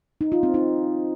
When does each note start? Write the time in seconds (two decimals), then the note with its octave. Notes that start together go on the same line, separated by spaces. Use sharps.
0.21 D#4
0.32 F4
0.43 C4
0.54 D#4